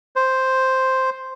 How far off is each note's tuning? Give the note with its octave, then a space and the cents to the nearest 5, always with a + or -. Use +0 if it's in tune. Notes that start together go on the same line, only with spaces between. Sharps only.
C5 +0